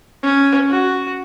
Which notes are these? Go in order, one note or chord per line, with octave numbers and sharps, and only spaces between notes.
C#4
F#4